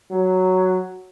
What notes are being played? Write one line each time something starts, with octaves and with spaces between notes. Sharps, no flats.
F#3